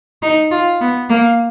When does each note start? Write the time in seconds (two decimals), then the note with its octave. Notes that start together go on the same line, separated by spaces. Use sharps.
0.22 D#4
0.51 F4
0.81 B3
1.10 A#3